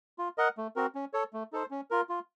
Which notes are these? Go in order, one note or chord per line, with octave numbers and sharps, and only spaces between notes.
F4
A#4 D#5 F#5
A3
C4 F#4 A#4
C#4
A4 C#5
A3
D#4 A4 C5
C#4
F4 A#4
F4